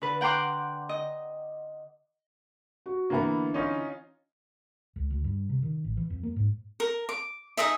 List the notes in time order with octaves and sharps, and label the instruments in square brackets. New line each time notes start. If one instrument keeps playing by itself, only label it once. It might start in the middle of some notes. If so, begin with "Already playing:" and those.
[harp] D3 B4
F#5 G5 A#5 C6 D6 F#6
D#5
[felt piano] F#4
[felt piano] D3 E3 [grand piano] A#3 B3 A#5
[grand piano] C#4 D#4 F4
[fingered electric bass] C#2
D2
G2
C3
D#3
A1
E3
F2
A#3
G#2
[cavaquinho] A#4
D6
D#4 G#4 D#5 E5